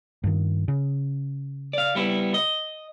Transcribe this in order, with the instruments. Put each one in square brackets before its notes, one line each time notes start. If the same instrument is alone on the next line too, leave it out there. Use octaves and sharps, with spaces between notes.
[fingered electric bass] G2 D#3
C#3
[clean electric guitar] D5 F5
G3 B3 E4
D#5